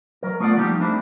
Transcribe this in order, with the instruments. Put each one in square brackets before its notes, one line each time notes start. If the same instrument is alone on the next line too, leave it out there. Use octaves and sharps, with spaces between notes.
[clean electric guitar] F#3 A#4
A3 B3 F4 C#5 D5 F#5
F3 G3 A#3 D#4 G4
A3 A#3 C4 D4 E4